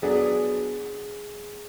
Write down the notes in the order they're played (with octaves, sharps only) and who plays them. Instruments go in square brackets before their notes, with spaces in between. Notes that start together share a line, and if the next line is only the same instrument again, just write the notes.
[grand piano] F#3 B3 D4 [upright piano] G#4